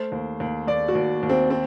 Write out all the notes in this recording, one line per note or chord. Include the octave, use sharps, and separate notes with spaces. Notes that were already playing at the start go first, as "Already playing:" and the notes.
Already playing: A3 C5
D#2
D#2
D#2 D5
F#4
D#2
D#2
C4
C4